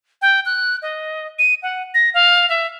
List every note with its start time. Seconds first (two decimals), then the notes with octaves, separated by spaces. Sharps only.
0.22 G5
0.46 F#6
0.82 D#5
1.39 D#7
1.63 F#5
1.94 A#6
2.14 F5
2.50 E5